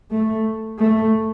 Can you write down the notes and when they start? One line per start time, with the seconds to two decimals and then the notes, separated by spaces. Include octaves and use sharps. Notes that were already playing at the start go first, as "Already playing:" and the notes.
0.11 A3
0.79 A3